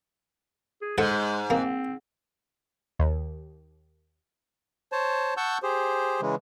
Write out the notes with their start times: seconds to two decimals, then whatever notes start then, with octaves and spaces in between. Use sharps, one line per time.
0.82 G#4
0.98 G#2 G#3 A4 F#5
1.50 A#3 C4
2.99 D#2
4.92 C5 C#5 A5
5.37 F#5 A5 C#6 E6 G6
5.63 G4 G#4 C5
6.21 C#3 E3 G#3